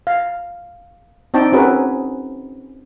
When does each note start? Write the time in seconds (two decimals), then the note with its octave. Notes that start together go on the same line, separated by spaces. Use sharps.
0.07 F5
1.34 C4 D4 D#4 G5 A5
1.53 C4 C#4 F#4 G#4 A#4 B4